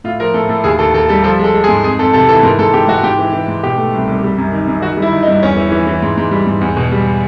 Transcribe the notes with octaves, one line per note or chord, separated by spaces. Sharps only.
A2 F4
F3 A#4
A2 A4
A2 A4
D#2 G#4
D#2 A4
D#2 A4
G3 A4
F3 A4
G#3 A4
G#3
G#4
G#2
F2 G#4
F2 A4
C3 A4
E3 A4
G#2 A#4
G#2 A4
G#2 G4
G#2 F#4
G#2 G4
E3
E3
G#2
B2 G4
A3
C2
C2
G3
F#2
D#3
F#2
D#3 F#4
G3
E4
D#3
D#4
G2
E2 C#4
E3
E3
E3
G#2
G#2
G3
G#2
E2
B2
G3